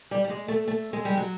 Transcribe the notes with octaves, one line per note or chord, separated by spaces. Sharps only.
G3
G3
G#3
A3
A3
G#3
G3
F#3